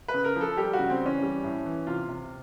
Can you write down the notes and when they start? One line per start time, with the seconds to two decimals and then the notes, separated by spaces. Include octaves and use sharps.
0.08 B4
0.14 C#3
0.24 A#4
0.36 F3
0.41 A4
0.57 G3 G4
0.73 F#4
0.78 C#3
0.90 C4
1.00 E3
1.06 C#4
1.22 G3
1.44 A2
1.65 E3
1.87 C3 F4
2.09 C3